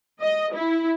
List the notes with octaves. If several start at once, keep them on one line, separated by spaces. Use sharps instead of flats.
D#5
E4